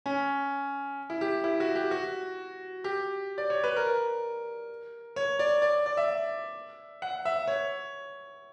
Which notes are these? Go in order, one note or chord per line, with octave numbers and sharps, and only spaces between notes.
C#4
E4
G4
E4
F#4
G4
F#4
G4
D5
C#5
B4
A#4
C#5
D5
D5
D5
E5
F#5
E5
C#5